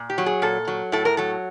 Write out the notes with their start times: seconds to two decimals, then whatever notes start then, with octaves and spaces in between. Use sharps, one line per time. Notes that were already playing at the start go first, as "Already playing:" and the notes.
Already playing: A#2
0.10 G4
0.18 F#3
0.26 G#4
0.42 A#2 A4
0.68 F#3
0.92 A2 A4
1.05 A#4
1.17 F#3 A4